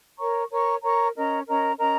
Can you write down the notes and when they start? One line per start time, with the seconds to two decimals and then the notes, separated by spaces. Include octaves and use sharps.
0.18 A#4 C#5 A#5 C#6
0.51 A#4 C#5 A#5 C#6
0.83 A#4 C#5 A#5 C#6
1.15 C#4 A#4 D#5 A#5
1.47 C#4 A#4 D#5 A#5
1.79 C#4 A#4 D#5 A#5